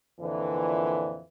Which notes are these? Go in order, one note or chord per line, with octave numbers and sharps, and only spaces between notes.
F2 A#2 D3 E3